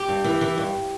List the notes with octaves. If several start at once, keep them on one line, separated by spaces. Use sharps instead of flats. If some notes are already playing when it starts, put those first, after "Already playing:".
Already playing: G4
G2
E3
E3
G2